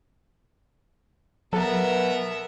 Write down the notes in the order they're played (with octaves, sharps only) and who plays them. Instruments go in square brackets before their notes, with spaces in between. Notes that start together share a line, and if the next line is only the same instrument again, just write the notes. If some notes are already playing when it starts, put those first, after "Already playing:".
[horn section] B2 B3 [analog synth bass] F#3 [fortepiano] A4 [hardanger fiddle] A#4 E5